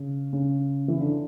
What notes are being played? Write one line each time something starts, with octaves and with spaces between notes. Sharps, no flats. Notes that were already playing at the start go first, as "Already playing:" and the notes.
Already playing: C#3
C#3
E3
D3